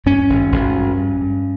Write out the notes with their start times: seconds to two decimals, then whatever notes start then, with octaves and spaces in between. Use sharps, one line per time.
0.06 G2 C#4
0.30 G#1
0.52 G#1
0.75 G2
0.98 G2
1.21 G2